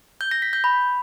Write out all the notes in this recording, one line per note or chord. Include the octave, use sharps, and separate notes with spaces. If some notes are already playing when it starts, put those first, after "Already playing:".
G6
A#6
B6
G6
B5